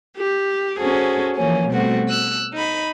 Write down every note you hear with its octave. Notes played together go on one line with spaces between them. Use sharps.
G4
C#4 F#4 G#4 A4 C5
E3 F3 A#3 C#4
B2 G3 A3 C4 F#4
E6 F#6
D#4 B5